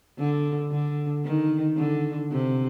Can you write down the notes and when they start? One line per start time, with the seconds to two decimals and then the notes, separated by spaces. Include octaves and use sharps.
0.18 D3
0.71 D3
1.24 D#3
1.77 D3
2.31 C3